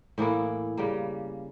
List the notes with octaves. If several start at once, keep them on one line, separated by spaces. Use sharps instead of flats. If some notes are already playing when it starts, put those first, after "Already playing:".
A2 E3 A#3 E4
C#3 G3 A#3